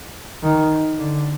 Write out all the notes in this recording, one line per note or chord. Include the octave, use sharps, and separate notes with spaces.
D#3
D3